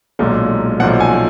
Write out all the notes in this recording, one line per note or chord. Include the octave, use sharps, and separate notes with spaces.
B1 A#2 G#3
B1 A#2 F3 F#5
G#5